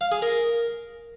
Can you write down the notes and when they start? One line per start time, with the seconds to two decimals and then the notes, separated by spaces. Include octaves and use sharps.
0.01 F5
0.12 G#4
0.22 A#4